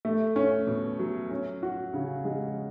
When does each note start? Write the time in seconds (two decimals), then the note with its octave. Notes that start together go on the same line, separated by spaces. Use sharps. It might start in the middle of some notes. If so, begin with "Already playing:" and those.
0.05 A3
0.36 C#4
0.67 B2
0.99 F#3
1.31 C#4
1.63 F#4
1.94 C#3
2.25 G#3